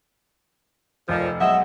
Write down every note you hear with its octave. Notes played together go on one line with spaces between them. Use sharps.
F1 F2 A#2 F3 D5
B1 G#3 D#5 E5 F#5